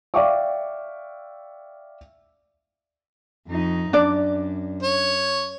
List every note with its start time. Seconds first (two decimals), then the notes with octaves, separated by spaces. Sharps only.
0.14 D5 E5 F5 G5 C#6 D6
3.48 F2 D#4
3.93 F#2 D4 D5
4.83 C#5